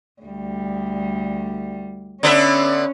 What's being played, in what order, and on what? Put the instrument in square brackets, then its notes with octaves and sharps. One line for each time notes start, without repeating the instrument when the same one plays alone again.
[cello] D2 G3
[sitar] D3 B3 E5 [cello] C#4